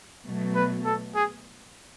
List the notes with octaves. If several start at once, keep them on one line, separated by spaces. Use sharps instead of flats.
B2 F#3 A3
B4
A4
G#4